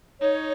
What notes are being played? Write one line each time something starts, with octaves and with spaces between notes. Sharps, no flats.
D#4 C#5